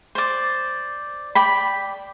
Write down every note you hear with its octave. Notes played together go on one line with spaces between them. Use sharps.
C5 D5
D5 G5 B5